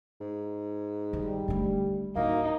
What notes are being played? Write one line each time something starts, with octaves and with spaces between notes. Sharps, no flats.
G#2
D#3 G3
D3 A3
D1 A#3 D#4 F#4